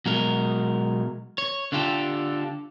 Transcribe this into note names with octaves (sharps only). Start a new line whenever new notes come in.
B2 F#3 G#3 A#4
C#5
D3 D4 F4 G4 A4